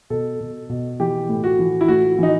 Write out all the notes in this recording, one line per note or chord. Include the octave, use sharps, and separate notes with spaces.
B2 A4
B2
B2
E3 G4
A2
F#4
E3
E4
A2 F#4
E3 D#4